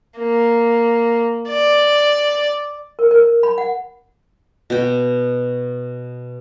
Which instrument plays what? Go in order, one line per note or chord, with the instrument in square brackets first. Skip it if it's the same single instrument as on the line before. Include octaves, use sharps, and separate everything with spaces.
[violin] A#3
D5
[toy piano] A#4
A#4
B5
F#5
[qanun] B2 G5